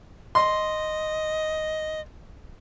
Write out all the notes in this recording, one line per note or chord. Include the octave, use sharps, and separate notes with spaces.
D#5 C6